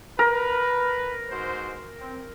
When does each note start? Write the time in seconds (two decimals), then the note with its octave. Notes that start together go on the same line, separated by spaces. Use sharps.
0.19 A#4 B4
1.30 G#2 F#4 C5
2.00 C4